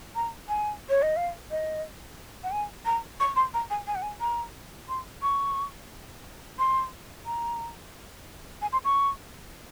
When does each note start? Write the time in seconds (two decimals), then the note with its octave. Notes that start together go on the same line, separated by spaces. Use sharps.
0.15 A#5
0.49 G#5
0.89 C#5
1.02 D#5
1.17 F5
1.51 D#5
2.44 F#5
2.52 G#5
2.86 A#5
3.20 C#6
3.36 C6
3.54 A#5
3.70 G#5
3.87 G#5
3.95 F#5
4.02 G#5
4.21 A#5
4.89 C6
5.22 C#6
6.59 C6
7.26 A#5
8.62 G#5
8.73 C6
8.85 C#6